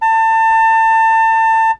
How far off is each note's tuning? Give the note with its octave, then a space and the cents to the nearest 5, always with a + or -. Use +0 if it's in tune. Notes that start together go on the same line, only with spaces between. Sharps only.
A5 +30